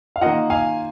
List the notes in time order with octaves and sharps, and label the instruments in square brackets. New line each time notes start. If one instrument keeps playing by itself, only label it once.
[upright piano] F5
D#3 A#3 F4 D#5 F#5
F5 G#5